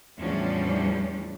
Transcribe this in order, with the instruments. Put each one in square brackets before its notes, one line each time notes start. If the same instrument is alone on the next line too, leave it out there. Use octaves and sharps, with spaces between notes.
[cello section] E2 A2 F3 G3 C#4 D4